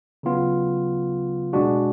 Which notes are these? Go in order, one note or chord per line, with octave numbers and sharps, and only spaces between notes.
C#3 F#3 B3 F4
B2 G#3 D4 F#4